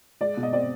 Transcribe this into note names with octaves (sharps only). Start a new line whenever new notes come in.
G#3 D5
B2
D#5
C4 D5